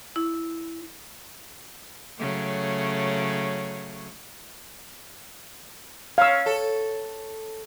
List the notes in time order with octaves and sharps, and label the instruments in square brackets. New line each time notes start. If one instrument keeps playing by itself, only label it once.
[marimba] E4
[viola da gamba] C#3 F#3 A3
[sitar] C#4 [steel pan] F5 E6
[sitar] A4